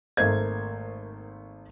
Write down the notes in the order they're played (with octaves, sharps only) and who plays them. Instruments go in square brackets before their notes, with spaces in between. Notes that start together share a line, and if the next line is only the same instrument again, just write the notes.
[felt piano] G#1 A3 A#3 C5 G#6